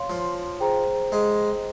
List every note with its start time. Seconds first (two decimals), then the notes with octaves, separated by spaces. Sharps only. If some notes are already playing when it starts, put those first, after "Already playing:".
Already playing: C#5 F5 C6
0.10 F3
0.60 G#4 C5 G5 A#5
1.12 G#3